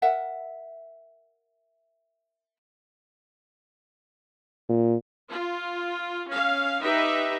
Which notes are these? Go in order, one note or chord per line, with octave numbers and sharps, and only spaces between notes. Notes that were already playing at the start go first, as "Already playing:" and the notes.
A#4 E5 F#5
A#2
F4
C#4 F5
D#4 G4 B4 E5